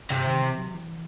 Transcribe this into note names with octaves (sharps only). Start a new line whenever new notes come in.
G2 C3
D#3
E3
F#3
E3